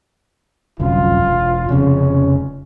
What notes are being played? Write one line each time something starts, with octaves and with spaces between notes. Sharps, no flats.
G1 C2 F#2 F4
E1
F1 F2 C#3 C#4